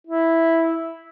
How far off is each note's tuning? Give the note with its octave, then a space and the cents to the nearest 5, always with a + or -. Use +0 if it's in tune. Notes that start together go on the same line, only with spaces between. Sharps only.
E4 -5